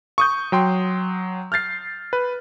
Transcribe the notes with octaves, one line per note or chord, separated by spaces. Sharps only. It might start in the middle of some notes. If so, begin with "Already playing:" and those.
C#6 D#6 G6
F#3 G5 C6
F6 G6 A6 C7
B4